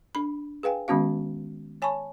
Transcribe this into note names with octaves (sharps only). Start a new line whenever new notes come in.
D4 B5
G#4 B4 F5 G5 G#5
D#3 G#3 B3 C#4 F#4 F5
C#5 G#5 A5 B5 C#6